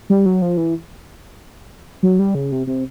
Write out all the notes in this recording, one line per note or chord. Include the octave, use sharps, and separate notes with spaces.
G3
F#3
F3
E3
F#3
G3
C#3
C3
C3